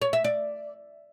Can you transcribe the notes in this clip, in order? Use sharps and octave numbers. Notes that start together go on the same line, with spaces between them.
C#5
E5
D5